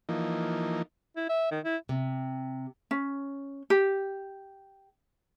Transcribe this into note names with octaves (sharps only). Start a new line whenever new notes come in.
E3 F3 A#3 D#4
E4
E5
D#3
E4
C3
C#4
G4